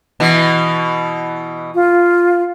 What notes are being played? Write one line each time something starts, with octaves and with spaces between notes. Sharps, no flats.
B2 E3
F4